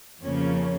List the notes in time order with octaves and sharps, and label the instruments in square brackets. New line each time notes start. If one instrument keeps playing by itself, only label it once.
[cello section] F2 C#3 F3 A#3 C#4